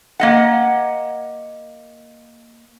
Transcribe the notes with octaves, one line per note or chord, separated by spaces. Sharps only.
A#3 D#5 F#5